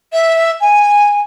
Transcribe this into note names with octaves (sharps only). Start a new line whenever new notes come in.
E5
G#5